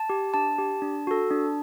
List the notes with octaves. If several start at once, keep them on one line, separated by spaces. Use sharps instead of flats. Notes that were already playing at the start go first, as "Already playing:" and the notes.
Already playing: A5
G4
D4 A5
G4
D4
F#4 A4
D4